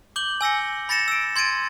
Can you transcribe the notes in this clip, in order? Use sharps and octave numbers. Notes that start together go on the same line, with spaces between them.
D6 G6 F#7 G7
G#5 E6 A#6 C#7
B5 A6 A#6 C#7 E7
E6 D7
C6 G#6 A6 D7 D#7